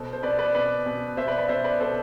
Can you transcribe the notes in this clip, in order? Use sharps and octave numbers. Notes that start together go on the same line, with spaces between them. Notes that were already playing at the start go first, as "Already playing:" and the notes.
Already playing: B2 A4 C5
C5
B2 B4 D5
B4 D5
B2 B4 D5
B2
B2 C5 E5
B4 D5
B4 D5
B2 C5 E5
B4 D5
B2 A4 C5